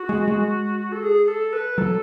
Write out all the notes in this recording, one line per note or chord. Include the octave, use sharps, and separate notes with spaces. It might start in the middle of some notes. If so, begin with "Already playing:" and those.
Already playing: F#4
G#3
G#3
A4
G#4
A4
B4
F#3 A4